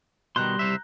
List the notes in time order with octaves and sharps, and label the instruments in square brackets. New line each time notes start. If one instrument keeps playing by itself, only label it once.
[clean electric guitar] B2 D#3 [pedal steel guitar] G3 C6 [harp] A#5 F#6 G6
[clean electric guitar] C2 C5 E5